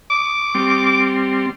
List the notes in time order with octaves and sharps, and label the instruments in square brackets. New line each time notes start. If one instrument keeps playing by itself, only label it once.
[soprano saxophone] D6
[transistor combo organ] G3 C4